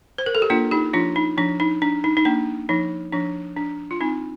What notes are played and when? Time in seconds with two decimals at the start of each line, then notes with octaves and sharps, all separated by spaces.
0.18 C5
0.26 A#4
0.35 A4
0.42 G4
0.50 A#3 D4 F4
0.71 D#4 G4
0.93 F3 D4 F4
1.16 D#4
1.38 F3 D4
1.60 D#4
1.82 D4
2.04 D#4
2.17 D#4
2.25 A#3 D4
2.69 F3 D#4
3.12 F3 D4
3.57 D4
3.91 F4
4.01 C4 D#4